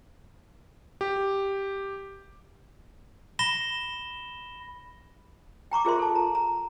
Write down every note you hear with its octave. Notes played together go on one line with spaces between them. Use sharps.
G4
B5 A#6 E7 G7
G5 A#5 C#6 D6
F4 G#4 A#4 C5 E5 C6
A4 A5
A#5
A#5